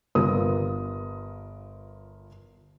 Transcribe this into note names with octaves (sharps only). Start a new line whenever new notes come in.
G1 F4 A#4 B4 D#6